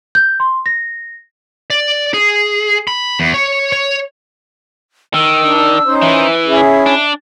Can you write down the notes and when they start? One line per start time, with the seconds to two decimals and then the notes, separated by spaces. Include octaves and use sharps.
0.15 G6
0.40 C6
0.66 A#6
1.70 D5
2.14 G#4
2.87 B5
3.20 E2
3.34 C#5
3.72 C#5
5.14 D#3 E6
5.43 D4
5.86 C#4 D#4 C5
6.02 E3 E5
6.46 C#4 E4 G#4
6.86 D4